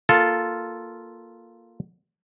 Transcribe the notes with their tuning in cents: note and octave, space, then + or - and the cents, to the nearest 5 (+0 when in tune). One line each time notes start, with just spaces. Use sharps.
A#3 +0 F4 +0 A4 +0